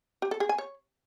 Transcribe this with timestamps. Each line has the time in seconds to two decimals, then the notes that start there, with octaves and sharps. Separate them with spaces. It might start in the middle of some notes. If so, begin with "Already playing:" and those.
0.22 G4
0.31 A4
0.40 G#4
0.49 G#5
0.58 C#5